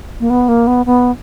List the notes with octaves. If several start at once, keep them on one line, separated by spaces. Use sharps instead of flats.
A#3
B3
A#3
B3
B3